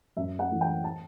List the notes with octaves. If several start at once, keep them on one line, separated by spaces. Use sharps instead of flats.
F#2 E5
F#5
E3 A3
G5
A5